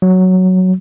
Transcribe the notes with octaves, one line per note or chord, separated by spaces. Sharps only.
F#3